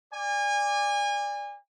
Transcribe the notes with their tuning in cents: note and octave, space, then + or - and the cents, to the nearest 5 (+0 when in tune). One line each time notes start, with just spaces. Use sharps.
D5 +0 G#5 -30